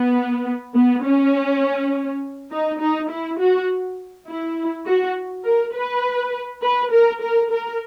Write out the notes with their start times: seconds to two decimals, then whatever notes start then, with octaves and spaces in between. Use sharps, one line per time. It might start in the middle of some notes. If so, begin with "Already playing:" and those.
Already playing: B3
0.75 B3
1.04 C#4
2.51 D#4
2.80 D#4
3.10 E4
3.39 F#4
4.27 E4
4.86 F#4
5.44 A#4
5.74 B4
6.62 B4
6.91 A#4
7.21 A#4
7.50 A#4